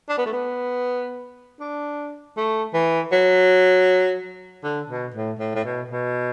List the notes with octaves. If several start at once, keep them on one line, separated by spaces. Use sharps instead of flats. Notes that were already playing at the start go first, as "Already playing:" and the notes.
D4
B3
A3
B3
D4
A3
E3
F#3
D3
B2
A2
A2
A2
B2
B2